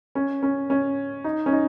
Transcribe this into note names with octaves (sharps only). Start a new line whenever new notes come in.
C#4
C#4
C#4
D#4
C#4
D#4